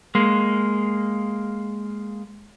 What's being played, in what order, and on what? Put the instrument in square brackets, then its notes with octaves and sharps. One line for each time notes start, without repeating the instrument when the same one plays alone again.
[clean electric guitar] G#3 A#3